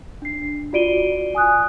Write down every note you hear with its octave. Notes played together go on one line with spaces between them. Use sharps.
D4 C7
F4 F#4 D5 D7 D#7 G7
G#5 D#6 F#6